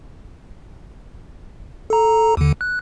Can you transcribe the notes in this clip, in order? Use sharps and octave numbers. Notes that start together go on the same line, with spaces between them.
A4 A#5
D#2 D3
F#6